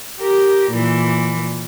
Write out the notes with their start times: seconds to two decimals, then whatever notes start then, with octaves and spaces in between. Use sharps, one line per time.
0.20 G4 A#4
0.71 A#2 E3